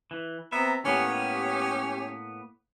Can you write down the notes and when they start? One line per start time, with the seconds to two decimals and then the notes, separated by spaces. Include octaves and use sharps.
0.11 E3
0.52 B3 C4 E5 A#5
0.85 A2 A#3 B3 C#4 G4